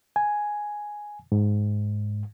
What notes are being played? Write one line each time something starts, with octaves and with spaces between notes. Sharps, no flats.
G#5
G#2